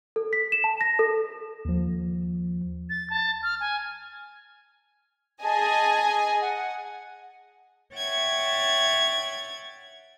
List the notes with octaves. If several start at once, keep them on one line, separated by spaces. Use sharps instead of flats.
A4
B6
E7
A5
A#6
A4
D#2 F3
A6
A5
F6
G#5
G#4 D#5 G#5 A5
F#5
C#5 E5 F#5 G5 G#6 A6